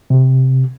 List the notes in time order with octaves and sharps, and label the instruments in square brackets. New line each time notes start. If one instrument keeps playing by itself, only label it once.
[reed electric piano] C3